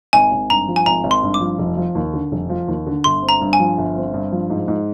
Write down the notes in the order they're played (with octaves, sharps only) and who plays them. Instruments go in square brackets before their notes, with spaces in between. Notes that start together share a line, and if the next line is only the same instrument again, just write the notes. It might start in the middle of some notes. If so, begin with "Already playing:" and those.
[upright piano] G#1 [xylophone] G#5
[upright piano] G#1
[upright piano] G2 [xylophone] A#5
[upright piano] F3
[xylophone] G#5
[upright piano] G#1 [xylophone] A#5
[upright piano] G#1
[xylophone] C6
[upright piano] G2
[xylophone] D6
[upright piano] F3
F1
F3
D#2
D3
F1
F3
D#2
D3
[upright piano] G1 [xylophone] C6
[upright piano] C4
[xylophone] A#5
[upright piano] G2
[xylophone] G#5
[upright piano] F3
G1
C4
G2
F3
G#2
G#2